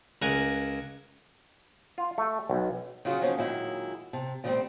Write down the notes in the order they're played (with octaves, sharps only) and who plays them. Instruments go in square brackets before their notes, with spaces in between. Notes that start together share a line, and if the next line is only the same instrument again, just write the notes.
[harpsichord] C#2 A#4 F#5 G#5
[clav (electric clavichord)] F4
A3
B1
[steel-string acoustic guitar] C#3 F#3 F4 F#4 G#4
F3 F#3 A#3 C#4 D#4
A#2 D#3 F#3 G#3 E4
C3 A5
D3 D#3 F3 G3 A3 C4